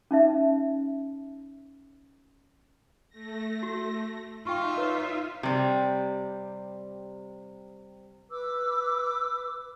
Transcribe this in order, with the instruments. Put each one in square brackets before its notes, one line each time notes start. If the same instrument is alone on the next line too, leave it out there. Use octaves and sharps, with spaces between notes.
[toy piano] C#4 D#4 E5
[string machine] A3 A#6
[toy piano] F#4
[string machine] D#4 E5 [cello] F4 [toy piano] G5 C#6
[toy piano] B4 C#5
[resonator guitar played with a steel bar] C3 G3
[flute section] B4 D6 E6